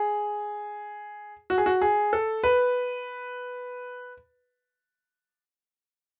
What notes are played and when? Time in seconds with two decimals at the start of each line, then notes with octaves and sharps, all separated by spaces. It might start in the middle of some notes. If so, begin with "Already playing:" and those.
Already playing: G#4
1.50 F#4
1.58 G#4
1.66 F#4
1.82 G#4
2.13 A4
2.44 B4